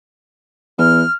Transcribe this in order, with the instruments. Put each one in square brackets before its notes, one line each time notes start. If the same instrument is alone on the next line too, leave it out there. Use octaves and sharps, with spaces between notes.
[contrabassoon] E2 [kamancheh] F6